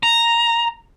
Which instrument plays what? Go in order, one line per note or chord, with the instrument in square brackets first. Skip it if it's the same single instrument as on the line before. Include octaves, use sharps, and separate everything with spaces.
[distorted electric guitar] A#5